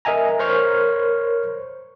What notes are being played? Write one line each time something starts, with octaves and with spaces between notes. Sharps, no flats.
A#4 D#5 E5 G#5 A#5
A#4 C5 C#5 C#6 F6